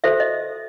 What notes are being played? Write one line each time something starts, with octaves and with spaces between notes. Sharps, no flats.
F#4 A4 C5 E5
D#5